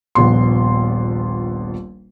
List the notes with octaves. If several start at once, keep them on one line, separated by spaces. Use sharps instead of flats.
D#1 A#1 B3 C6